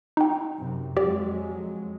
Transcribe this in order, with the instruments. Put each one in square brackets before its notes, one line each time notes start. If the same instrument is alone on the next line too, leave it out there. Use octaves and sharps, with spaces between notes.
[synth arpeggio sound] D#4 G5
[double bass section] F#2 C3
[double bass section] F2 F#3 G#3 [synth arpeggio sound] G4 D5